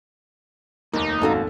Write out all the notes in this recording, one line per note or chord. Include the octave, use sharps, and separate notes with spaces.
F1 D#2 A#3 D#4 D6
G#1 C#4 F#4 A4 F5